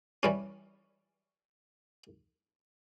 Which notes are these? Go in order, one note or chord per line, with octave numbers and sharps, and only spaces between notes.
E3 G3 C#4